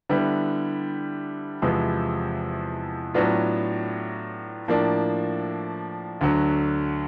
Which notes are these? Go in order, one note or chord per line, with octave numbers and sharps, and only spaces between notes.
D3 G3 B3 E4
E2 C3 F3 G#3 B3
A2 F#3 B3 D4 F4
A2 F3 A#3 D4
D2 D3 F#3